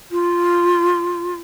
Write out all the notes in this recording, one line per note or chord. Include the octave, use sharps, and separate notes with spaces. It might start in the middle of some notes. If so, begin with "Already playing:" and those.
F4